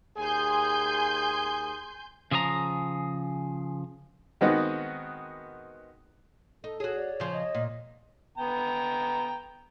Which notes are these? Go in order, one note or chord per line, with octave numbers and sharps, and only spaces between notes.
D#2 G#4 G#5 C6 G6
C#3 F3 G#4 C#5 A#5
D#3 G#3 B3 C4 D#4 F#4
D#4 A4
F#4 G#4 C#5
D5
C#3 F3
D#5
A#2
B3 G5 A#5